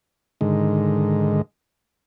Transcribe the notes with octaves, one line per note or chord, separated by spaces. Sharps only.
G#2 D3 D#3 G#3